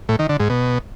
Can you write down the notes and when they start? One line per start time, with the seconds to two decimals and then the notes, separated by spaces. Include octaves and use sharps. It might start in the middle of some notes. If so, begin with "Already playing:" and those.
0.09 A2
0.19 D#3
0.29 D3
0.40 G#2
0.50 B2